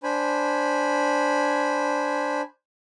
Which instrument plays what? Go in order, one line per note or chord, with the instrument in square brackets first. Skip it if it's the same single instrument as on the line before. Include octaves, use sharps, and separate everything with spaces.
[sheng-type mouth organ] D4 C5 G#5 B5